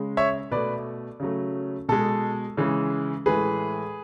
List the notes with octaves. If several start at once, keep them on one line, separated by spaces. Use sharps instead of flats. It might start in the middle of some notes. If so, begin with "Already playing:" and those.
Already playing: C#3 G#3
C#5 E5
B2 A3 B4 D5
C#3 F#3 A3
B2 G#3 A4
C#3 E3 G#3
A2 E3 G#3 G#4 B4